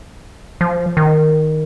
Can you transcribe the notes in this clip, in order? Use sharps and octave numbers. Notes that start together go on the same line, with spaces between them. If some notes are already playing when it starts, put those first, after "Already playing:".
F3
D#3